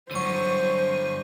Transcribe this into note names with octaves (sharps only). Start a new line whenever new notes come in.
G2 D3 F#3 C5 C#6 D#7